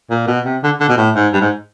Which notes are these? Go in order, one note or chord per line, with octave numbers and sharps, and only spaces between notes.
A#2
B2
C3
D3
D3
B2
A2
G#2
G2
G#2